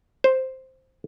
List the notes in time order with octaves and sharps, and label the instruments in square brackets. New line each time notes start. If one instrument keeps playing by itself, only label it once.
[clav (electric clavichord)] C5